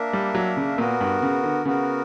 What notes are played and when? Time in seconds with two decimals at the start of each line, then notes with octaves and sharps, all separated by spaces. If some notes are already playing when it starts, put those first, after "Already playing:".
Already playing: A#3 D4 A#4 E5
0.13 G3
0.35 F#3
0.57 C#3
0.78 A#2 B3 F#4 A#4
1.01 G2
1.22 C#3
1.44 D3
1.65 C#3 B3 F#4 A#4